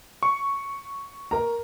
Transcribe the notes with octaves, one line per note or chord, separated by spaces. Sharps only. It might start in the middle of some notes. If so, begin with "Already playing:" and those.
C#6
A#4 A#5